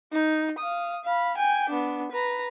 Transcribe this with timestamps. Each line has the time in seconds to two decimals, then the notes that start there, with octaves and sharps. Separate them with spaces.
0.13 D#4
0.58 F5 D#6
1.04 F5 B5
1.37 G5 G#5
1.70 B3 D4
2.12 B4 A#5